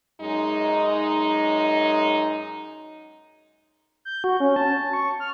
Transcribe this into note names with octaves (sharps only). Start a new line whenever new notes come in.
F#2 G#3 D#4
G6
F#4
C#4
A5
C#6
F6